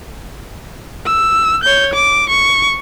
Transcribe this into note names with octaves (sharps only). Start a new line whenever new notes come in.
E6
C#5 G6
D6
C#6